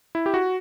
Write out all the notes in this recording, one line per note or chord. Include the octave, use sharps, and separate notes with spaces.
E4
G4
F#4